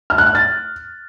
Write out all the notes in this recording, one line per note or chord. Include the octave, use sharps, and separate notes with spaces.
F6
F#6
F6
A6